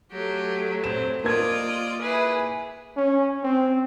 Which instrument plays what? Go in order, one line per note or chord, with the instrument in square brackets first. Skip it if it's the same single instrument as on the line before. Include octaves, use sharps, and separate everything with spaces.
[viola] F#3 A3 [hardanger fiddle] G4
[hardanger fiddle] C4 [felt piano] E7
[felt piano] A#3 G#6 [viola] F4 [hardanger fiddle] D5 D#5
[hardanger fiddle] E4 G#4 [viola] B4
[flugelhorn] C#4
C4